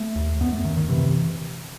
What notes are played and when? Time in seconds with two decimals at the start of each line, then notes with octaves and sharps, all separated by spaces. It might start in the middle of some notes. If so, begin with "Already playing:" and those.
Already playing: A3
0.15 D#2
0.41 F#2 B3
0.53 A3
0.64 F#2 D#3
0.77 D#3
0.89 C3 E3